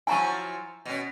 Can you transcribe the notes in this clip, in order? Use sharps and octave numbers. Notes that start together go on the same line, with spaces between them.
F3 F#3 E4 G#5 A#5 C#6
B2 C#4